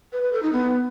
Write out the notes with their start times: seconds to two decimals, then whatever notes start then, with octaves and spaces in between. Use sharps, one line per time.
0.13 B4
0.23 B4
0.33 A4
0.43 D#4
0.53 B3